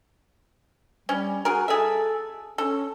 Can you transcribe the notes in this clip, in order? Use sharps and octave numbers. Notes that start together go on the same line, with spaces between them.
G3 C#4
F#4 G#4 A#4
G#4 A4 E5
C#4 A4